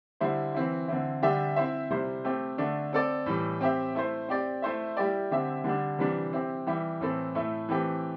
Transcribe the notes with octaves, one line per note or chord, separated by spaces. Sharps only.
D3 G3 E4 C5
E3 C4 E4
D3 C4 E4
D3 G3 D4 G4 E5
C4 E4 C5 E5
C3 G3 E4 C5
A3 C4 G4
D3 A3 D4
C4 A4 D5
A2 E3 G3
C4 G4 E5
A3 E4 C5
C4 G4 D5
A3 E4 C5 E5
G3 E4 G4 D5
D3 C4 G4 E5
D3 G3 D4
C3 E3 G3 D4
C4 E4 G4
E3 G3 E4 G4
A2 E3 C4 A4
A2 A3 E4
E3 A3 C4 G4